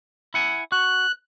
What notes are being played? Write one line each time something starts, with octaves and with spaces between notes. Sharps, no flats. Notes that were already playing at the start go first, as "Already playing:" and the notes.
E4 F#5 G#5
F#4 F#6